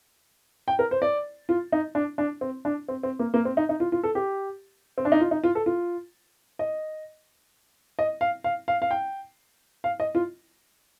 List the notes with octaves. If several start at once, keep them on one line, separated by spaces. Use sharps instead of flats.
G5
A#4
C5
D5
F4
D#4
D4
D4
C4
D4
C4
C4
A#3
A#3
C4
D#4
D#4
F4
F4
A4
G4
C4
D4
D#4
F4
D#4
F4
A4
F4
D#5
D#5
F5
F5
F5
F5
G5
F5
D#5
F4